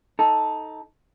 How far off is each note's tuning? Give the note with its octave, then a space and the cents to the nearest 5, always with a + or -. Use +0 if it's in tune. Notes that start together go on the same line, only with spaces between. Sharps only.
D#4 +15 A4 +0